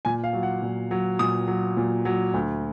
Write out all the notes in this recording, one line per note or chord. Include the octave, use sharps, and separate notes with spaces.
A#2 G#5
F5
F#3
F#5
A#2
F#3
A#2 D#6
F#3
A#2
F#3
D2